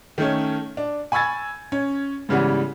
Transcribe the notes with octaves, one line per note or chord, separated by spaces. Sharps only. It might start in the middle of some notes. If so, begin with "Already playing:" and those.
D#3 A3 C#4
D4
G#5 B5 C#6 E6 G#6 A6
C#4
G#2 C#3 E3 G3 B3